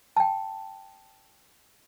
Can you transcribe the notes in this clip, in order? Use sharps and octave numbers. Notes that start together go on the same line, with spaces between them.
G5 A5